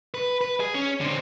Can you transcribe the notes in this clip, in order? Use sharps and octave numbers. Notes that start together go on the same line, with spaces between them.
B4
B4
G#4
C#4
D3 C4